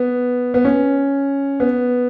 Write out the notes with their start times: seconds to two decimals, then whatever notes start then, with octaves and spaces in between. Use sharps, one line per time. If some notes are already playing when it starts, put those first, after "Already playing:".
Already playing: B3
0.54 B3
0.65 C#4
1.60 B3